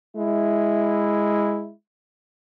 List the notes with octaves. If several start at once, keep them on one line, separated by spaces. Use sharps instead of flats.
G#3 E4